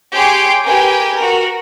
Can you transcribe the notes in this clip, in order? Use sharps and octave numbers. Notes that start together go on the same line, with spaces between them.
G4 G#4 C#5 C6 D6 D7
G4 G#4 A#4 B4 G5 G#5
F#4 A#4